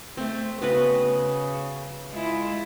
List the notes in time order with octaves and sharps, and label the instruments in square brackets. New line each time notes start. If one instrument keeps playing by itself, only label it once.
[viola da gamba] A3 [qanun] C4
[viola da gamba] C#3 [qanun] B3 F#4 B4
[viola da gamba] G#3 E4 F4